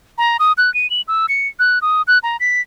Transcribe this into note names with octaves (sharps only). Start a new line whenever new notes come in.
A#5
D#6
F#6
D#7
F#7
E6
C#7
F#6
D#6
F#6
A#5
B6